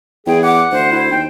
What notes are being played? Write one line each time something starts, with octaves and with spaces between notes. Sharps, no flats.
E2 G#4 G5
F#5 D6
D2 C5
E4
D#2 G5